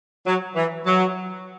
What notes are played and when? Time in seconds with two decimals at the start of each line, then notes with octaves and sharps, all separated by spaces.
0.25 F#3
0.55 E3
0.85 F#3